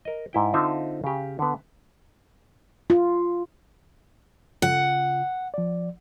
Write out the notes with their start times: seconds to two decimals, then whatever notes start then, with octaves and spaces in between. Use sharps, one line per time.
0.05 A#4 D#5
0.33 G#2 E4 G5
0.54 D3 C4 D#4 F4 E5
1.04 C#3 G4
1.39 D3 B3
2.90 F4
4.62 C#3 F4 F#5
5.54 F3 D5